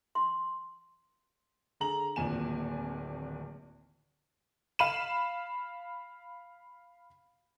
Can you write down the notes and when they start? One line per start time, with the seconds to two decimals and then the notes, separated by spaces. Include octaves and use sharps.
0.15 C6
1.80 D3 G#4 A#5 F#7
2.16 D1 G#1 A#2 G#5 E7
4.79 F5 B5 E7